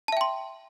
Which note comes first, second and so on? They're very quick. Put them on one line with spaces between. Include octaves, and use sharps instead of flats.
A5 E5 G5 C6